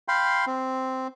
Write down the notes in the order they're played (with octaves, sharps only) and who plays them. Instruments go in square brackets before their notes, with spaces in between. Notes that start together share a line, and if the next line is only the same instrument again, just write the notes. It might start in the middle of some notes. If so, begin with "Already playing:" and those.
[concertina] F5 G5 B5 C6
C4